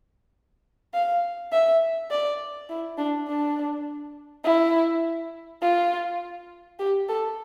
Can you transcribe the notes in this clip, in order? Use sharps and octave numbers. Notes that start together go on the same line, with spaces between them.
F5
E5
D5
E4
D4
D4
E4
F4
G4
A4